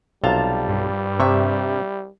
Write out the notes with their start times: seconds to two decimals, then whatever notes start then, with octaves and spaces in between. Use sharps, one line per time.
0.24 B1 C3 G3 F4 A5 A#5
0.68 G2
1.20 C3 E5 C#6